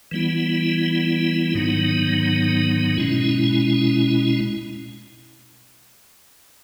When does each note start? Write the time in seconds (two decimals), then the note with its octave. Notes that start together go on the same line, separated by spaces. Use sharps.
0.11 E3 G3 B3 E4
1.55 G#2 D#3 F#3 B3 D#4
2.98 B2 G#3 C#4 E4